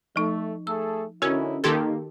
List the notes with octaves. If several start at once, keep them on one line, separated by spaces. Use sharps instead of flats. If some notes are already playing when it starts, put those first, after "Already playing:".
F3 A3 D#4
A3 G#4 A4 E6
D3 C#4 D#4 E4 F#4 A#4
D#3 A#3 G4 A4 C6 G#6 A6